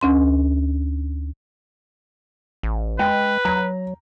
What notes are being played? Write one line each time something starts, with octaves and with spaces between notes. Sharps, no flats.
D2 C#4 C6
A1
G#3 B4 G5
F#3 A#5